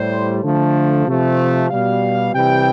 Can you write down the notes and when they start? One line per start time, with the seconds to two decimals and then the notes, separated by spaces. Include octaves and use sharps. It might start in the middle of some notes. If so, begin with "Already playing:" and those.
Already playing: A2 G3 C5
0.42 D3 F3 A3
1.06 C3 F3 A3
1.70 B2 G3 F5
2.34 C3 E3 G3 G5